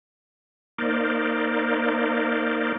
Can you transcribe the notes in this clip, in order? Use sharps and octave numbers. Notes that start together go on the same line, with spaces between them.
A#3 D#4 A#4 C5 D5